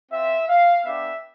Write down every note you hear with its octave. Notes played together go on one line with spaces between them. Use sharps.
C4 F4 E5
F5
B3 D4 G4 E5